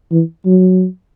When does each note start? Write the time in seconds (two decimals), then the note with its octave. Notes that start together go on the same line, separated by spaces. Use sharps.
0.12 E3
0.46 F#3